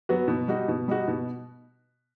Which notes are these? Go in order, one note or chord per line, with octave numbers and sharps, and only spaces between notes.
F#3 B3 F#4
B2
G3 D#4 F#4
B2
G3 D#4 F#4
B2